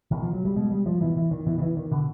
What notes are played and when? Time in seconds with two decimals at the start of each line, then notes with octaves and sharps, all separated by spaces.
0.11 B2 D#3
0.22 F3
0.33 F#3
0.45 G3
0.56 B2 G#3
0.71 G3
0.86 F3
1.01 B2 E3
1.17 E3
1.31 D#3
1.46 B2 E3
1.58 D#3
1.62 E3
1.77 D#3
1.91 B2 D3